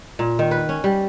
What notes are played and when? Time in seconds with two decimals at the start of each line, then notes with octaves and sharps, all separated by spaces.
0.19 A#2
0.39 D#3
0.51 B4
0.69 C#4
0.84 G3